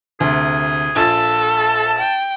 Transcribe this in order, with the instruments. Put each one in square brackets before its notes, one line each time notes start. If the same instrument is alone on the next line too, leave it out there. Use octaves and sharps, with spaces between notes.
[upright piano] D2 C3 [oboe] G#4
[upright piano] A#1 F4 A6 [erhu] A4
[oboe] A5
[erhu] G5